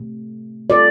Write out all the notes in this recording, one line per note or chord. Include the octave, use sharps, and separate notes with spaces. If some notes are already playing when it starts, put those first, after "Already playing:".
Already playing: C3 A3
G3 C4 F4 A4 D5